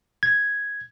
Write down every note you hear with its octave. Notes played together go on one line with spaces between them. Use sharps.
G#6